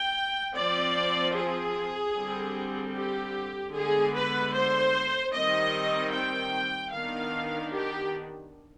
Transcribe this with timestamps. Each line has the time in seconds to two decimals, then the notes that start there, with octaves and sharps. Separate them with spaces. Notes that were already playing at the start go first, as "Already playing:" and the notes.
Already playing: G5
0.55 F3 C4 D5
1.35 G#4
2.15 D3 G3 C4
2.95 G4
3.74 D3 G#3 B3 G#4
4.14 B4
4.55 C5
5.34 D#3 G3 C4 D#5
6.14 G5
6.93 D#3 B3 D4 F5
7.73 G4